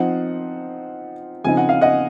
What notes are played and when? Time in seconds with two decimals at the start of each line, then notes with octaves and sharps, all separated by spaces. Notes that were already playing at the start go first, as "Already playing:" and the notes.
Already playing: F3 C4 D#4 F#5
1.44 C#3 F3 C4 D#4 G#5
1.57 F#5
1.69 F5
1.81 D#5 F#5